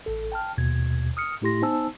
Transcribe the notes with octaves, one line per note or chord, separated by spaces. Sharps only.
A1 A4
G5 A5 F6
D#2 B2 G#6
D#6 F6 C#7
A2 A3 E4 G4 C6 A#6
B3 D#4 C5 G#5 A5 E6